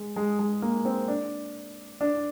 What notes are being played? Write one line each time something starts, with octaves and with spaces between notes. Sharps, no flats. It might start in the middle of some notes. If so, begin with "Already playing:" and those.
Already playing: G#3
G#3
G#3
A#3
C4
D4
D4